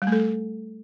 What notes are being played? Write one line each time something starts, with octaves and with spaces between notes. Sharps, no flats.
G3
A3
A4